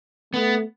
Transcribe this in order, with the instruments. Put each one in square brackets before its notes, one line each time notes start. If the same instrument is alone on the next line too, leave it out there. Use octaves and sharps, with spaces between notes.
[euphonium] A3 [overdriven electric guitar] B3